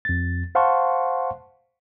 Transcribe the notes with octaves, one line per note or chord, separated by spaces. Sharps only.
F2 A6
C5 F5 F#5 A5 C6 C#6